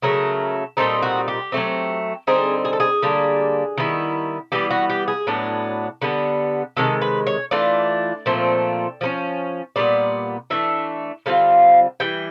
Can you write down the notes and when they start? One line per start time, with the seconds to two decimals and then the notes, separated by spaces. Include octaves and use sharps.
0.02 C#3 F#3 A3 A#4
0.77 A#2 G3 C4 D#4 A4
1.02 F#4
1.28 G4
1.52 F#3 A3 C4
2.27 D3 G3 C4 D#4 G#4
2.65 G#4
2.73 A4
2.80 G#4
3.02 D3 G3 A#3 D4
3.78 D#3 G3 B3 E4
4.52 E3 G3 B3 G4
4.71 F#4
4.90 G4
5.08 G#4
5.27 A2 F#3 B3 D4
6.02 D3 G3 B3
6.77 C3 D#3 G#3 A4
7.01 B4
7.27 C#5
7.51 E3 A3 D4 F4 D5
8.26 A#2 F3 A3 C4
9.01 F3 A3 C#4
9.76 A#2 G3 B3 D5
10.50 E3 A3 D4 E5
11.26 D3 G3 C4 F4 F5
12.00 E3 G3 G5